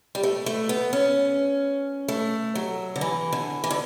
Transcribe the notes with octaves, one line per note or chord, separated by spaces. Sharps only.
G3
A3
A3
B3
C#4
A3
F#3
D3
E3
D3
E3
D3